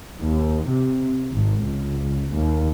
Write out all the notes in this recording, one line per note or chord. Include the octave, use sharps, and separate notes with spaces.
D#2
C3
G#1
C#2
D#2